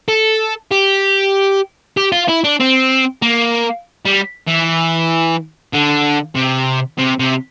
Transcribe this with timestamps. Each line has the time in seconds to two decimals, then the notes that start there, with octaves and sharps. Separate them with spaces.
0.08 A4
0.72 G4
1.97 G4
2.12 F4
2.28 E4
2.44 D4
2.60 C4
3.22 A#3
4.05 G3
4.48 E3
5.73 D3
6.35 C3
6.98 C3
7.19 C3